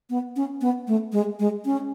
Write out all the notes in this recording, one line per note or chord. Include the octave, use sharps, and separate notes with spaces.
B3
C#4
B3
A3
G#3
G#3
C#4